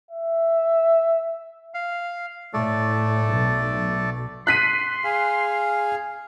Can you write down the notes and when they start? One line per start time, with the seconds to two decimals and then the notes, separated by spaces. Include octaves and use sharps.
0.11 E5
1.74 F5
2.54 A2 A3 A4 D5
3.27 B1
4.47 C6 F#6 B6 D#7
5.04 G#4 F5